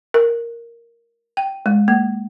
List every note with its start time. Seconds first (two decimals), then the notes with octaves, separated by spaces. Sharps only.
0.14 A#4
1.37 G5
1.66 G#3
1.88 A#3